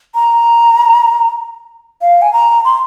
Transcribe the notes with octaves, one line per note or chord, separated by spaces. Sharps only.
A#5
F5
G#5
A#5
C6